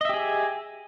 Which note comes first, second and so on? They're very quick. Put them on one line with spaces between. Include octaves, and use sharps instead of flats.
D#5 E5 G4 G#4